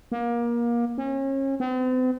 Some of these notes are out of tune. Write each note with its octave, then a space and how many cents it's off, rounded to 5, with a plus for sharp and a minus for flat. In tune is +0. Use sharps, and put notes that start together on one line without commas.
A#3 +25
C#4 -35
C4 -45